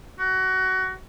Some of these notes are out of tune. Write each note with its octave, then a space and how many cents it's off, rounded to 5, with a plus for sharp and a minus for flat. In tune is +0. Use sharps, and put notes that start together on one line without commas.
F#4 +20